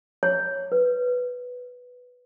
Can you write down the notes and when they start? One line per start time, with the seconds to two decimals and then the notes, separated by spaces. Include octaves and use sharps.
0.23 C#5
0.72 B4